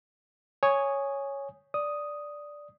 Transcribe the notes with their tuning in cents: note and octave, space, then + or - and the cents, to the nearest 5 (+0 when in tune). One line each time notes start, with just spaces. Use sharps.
C#5 +0 G#5 -5 D#6 -5
D5 +0 D#6 +0